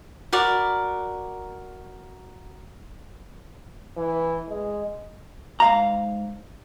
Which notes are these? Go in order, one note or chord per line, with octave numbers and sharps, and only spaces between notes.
F#4 A#4 D5 B5
E3
G#3
G#2 F5 A#5